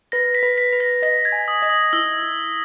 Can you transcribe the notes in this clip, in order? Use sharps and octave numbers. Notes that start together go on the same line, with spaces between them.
B4 A#6
B6
B4
B6
B4
A#6
D#5 A#6
G#6
G#5
D#6
D#5
D#6
E4 E6
E4